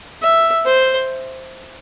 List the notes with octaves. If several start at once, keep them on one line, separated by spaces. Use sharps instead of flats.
E5
C5